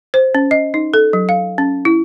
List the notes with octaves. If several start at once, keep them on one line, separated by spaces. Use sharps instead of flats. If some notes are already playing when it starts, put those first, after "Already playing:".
C5
C#4
D#5
D#4
A4
F#3
F5
C#4
E4